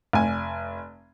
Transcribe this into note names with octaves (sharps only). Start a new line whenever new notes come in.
F1 G#5